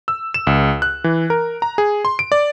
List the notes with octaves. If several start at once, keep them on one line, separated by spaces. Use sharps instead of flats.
E6
E7
C#2
F#6
E3
A#4
A#5
G#4
C6
D7
D5